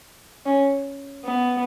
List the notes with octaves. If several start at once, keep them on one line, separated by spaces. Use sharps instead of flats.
C#4
B3